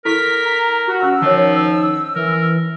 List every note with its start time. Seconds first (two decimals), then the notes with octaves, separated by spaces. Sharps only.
0.05 E4 A4 A#4 C#6 B6
0.43 A#5
0.88 F#4
1.00 C#4 F5 C#6 E6
1.22 D#3 F3 C#5 E5 F#5
2.16 E3 A#4